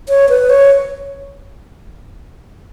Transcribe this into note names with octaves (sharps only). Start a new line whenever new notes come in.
C#5
B4
C#5